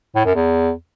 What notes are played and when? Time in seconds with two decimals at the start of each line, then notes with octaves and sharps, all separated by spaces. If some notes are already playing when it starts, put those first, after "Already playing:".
0.16 A2
0.26 F#2
0.35 E2